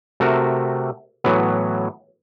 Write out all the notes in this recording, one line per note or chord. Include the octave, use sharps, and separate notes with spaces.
C3 A3 C4 F#4 A#4
A2 E3 F#3 B3